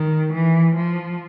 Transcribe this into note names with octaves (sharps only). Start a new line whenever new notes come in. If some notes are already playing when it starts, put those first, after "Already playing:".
Already playing: D#3
E3
F3